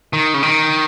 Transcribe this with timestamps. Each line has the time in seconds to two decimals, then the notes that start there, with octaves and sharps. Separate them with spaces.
0.13 D#3
0.34 C#3
0.43 D#3